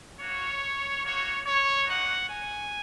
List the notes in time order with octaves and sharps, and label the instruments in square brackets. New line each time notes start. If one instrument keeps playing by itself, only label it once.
[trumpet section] A#3 F#4 C#5
A#3 F#4 C#5
C#5
A#3 D#4 F#4 F#5
G#5